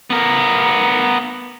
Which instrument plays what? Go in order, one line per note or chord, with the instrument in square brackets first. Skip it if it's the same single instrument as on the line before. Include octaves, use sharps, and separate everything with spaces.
[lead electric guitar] B3 A#4